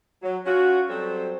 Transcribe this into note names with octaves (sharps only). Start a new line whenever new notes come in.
F#3
C#4 F4 F#4
F#3 G3 C4 A4 C5